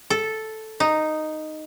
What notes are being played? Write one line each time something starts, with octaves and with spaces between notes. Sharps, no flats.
A4
D#4